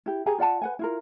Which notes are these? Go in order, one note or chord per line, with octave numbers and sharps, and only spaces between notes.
E4 G4
G4 G#4 G#5 A#5
F4 D5 F#5 A5
B4 F#5 G#5
E4 F4 A#4